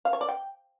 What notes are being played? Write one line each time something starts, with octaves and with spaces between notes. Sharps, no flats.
F5
C#5
D5
G5